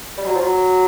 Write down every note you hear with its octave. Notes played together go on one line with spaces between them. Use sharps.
G3
F#3
F3
F#3